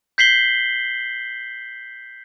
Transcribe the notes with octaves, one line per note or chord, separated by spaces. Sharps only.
G6 B6 C7 F#7 G7